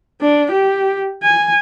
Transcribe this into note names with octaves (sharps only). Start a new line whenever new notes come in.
D4
G4
G#5